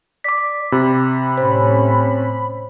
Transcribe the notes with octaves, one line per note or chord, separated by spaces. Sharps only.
D5 D6 B6
C3 B5
A2 C#4 C5